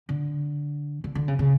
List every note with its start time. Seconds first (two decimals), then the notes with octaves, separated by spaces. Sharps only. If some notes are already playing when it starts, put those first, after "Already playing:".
0.09 D3
1.04 D3
1.15 D3
1.28 C#3
1.39 C#3